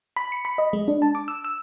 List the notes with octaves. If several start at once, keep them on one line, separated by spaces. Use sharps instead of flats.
B5
C#7
B5
D#5
G#3
D4
A5
D6
E6
E6